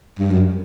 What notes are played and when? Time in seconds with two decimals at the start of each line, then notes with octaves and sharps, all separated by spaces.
0.19 G2
0.31 F#2